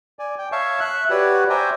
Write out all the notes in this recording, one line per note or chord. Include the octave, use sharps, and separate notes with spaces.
D5 G#5
G5
C#5 E5 F5 A5 C#6
E5 F#6
F#4 G4 B4 C#5 D5 F#5
C5 D5 E5 G5 G#5 A#5